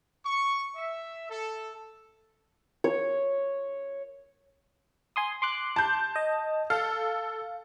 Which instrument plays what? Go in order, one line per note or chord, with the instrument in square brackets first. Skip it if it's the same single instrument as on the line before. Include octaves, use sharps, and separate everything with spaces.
[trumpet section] C#6
E5
A4
[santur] C#5
[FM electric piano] G#5 C6 D#6
C6 D6 F#6
[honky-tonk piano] A5 G6
[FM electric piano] D#5
[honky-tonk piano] A4 [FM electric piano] F5